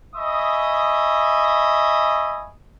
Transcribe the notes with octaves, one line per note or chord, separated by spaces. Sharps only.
D#5 E5 G#5 B5 C#6 D#6